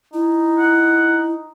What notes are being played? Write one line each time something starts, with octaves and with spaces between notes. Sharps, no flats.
D#4 E4
F#5